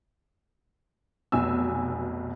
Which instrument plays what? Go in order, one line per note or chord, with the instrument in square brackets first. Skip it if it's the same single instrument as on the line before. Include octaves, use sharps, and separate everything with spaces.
[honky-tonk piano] F1 B1 B2 G#5 E6